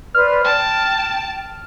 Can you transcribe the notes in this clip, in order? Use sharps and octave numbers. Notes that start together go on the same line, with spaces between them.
B4 C5 D5 F6
G5 A5